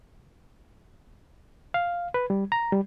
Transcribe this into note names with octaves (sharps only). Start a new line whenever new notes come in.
F5
B4
G3
A#5
G3